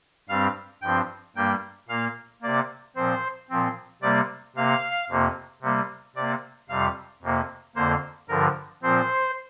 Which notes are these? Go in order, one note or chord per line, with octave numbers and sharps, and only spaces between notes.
G2 G3 C4 F5
G2 F3 C4 G5
G2 G3 A#3 G5
A#2 A#3 F5
C3 A#3 D5
A#2 F3 C4 C5
A#2 F3 C4
C3 G3 A#3 D5
C3 A#3 F5
F2 C3 A#3
C3 G3 A#3
C3 A#3 D5
F2 C3 G3 F5
F2 C3 A#3
F2 D3 A#3 C5
G2 D3 F3 A#4
A#2 F3 C4 C5